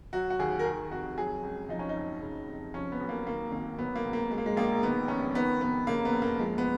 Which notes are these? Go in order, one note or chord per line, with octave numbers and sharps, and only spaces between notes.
F#3 F#4
F#4
D#2 G#4
A#4
D#3 G#4
F1 F#4
F#3 G#4
C#2
F3 D#4
C#4
D#4
F#1
C#3
F1
F3 C#4
B3
B1
A#3
D#3 A#3
G#1 A#3
F#3 B3
A#3
C#2
A#3
F#3 G#3
A#3
G#3
A#1 A#3
D#3 B3
F1 C#4
D#3 B3
F1 B3
C#3 A#3
B3
F#1
A#3
F3 G#3
B3